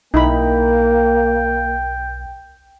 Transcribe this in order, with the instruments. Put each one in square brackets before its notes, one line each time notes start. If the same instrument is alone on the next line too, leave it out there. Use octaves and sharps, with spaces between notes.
[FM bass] B1 [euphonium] A#3 [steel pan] D#4 E4 B5 [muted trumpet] G5